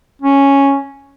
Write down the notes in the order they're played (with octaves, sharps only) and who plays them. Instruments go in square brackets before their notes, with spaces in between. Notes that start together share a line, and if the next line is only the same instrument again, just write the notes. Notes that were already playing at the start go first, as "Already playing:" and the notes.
[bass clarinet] C#4